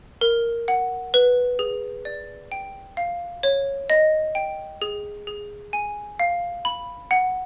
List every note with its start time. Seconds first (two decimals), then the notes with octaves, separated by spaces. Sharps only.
0.21 A#4
0.68 F#5
1.14 B4
1.59 G#4
2.05 D5
2.52 G5
2.97 F5
3.43 C#5
3.90 D#5
4.35 G5
4.82 G#4
5.27 G#4
5.73 G#5
6.20 F5
6.65 B5
7.11 F#5